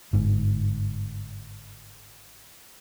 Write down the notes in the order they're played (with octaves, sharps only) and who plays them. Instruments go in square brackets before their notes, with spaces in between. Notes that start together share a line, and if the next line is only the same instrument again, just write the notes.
[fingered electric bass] G1 G#2